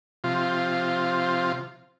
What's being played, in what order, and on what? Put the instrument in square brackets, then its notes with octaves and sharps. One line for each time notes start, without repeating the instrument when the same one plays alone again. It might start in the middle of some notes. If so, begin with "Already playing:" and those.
[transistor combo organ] C3 F3 F4